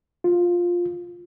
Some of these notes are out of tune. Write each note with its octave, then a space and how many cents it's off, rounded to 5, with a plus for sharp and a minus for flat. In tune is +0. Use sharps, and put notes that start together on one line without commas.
F4 +5